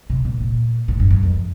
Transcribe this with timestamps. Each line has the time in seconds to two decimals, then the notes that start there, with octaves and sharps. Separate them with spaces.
0.10 C3
0.25 A#2
0.41 A#2
0.88 A2
1.00 G2
1.11 G2
1.23 F2